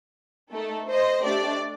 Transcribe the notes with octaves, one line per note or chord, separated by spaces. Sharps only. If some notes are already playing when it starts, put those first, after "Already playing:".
A3 D#4 A4
C5 D#5
A3 D4 G4 D5